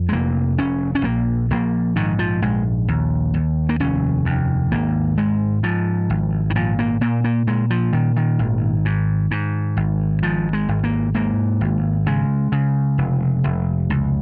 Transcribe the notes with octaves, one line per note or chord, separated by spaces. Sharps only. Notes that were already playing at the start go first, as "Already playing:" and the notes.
Already playing: F2
G#3
F1 A#3
F1 C#4
C#4
A#1 A#3
A#1 A#3
G#2 D#3
F3
A#1 G#3
D#2
D#2
A#3
F1 C#4
D#2
G#1 A#3
G#2 G#3
G#2 F3
G#1
D#3
A#2 F3
A#3
A#2 A#3
A#3
A#2 G#3
F3
A#2 D#3
D#3
G#1
G#2
G#2
G#1
G#2 F3
G#3
G#1
A#3
G#2 A#3
G#1
C#3 G#3
C#3
F1
F1
C#2